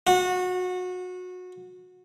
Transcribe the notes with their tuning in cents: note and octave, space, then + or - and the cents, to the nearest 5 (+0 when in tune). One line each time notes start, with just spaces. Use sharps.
F#4 -25